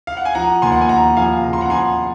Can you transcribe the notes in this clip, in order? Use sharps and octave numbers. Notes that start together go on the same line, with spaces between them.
F5
F#5
G#5
F3 F#5 A#5
D#2 G#5 C6
F#5
G#5
D#2 F#5 A#5
F3 F5 G#5
C#3 A#5
C6
F#5 A#5
F3 G#5 C6